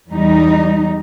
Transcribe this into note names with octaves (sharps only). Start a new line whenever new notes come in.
E2 G3 D#4